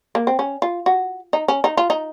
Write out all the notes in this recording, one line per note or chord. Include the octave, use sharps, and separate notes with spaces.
A#3
C4
C#4
F4
F#4
D#4
C#4
D#4
F4
D#4